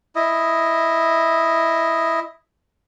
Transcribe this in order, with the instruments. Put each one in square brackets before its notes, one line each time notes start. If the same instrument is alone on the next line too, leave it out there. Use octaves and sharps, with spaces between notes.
[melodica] E4 D#5